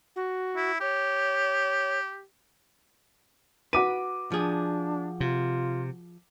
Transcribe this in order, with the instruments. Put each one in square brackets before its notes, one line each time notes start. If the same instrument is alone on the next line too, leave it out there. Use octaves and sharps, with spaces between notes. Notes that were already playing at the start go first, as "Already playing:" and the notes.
[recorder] F#4
[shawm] E4
[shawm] G4 [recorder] C#5
[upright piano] F#4 D6 D#7 [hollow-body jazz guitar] B4
[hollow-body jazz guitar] F3 G#4 [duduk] D4
[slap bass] C3 [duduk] F4